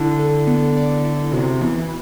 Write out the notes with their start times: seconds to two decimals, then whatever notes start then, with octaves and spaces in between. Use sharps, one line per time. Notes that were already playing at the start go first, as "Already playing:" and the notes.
Already playing: D3 E4
0.19 A4
0.47 B3
0.77 D5
1.05 E4
1.32 C3 F#4
1.61 E3 B3